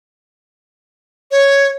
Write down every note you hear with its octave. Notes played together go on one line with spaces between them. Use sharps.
C#5